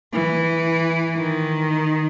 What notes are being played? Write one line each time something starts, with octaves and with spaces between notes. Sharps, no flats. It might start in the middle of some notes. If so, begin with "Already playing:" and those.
E3
D#3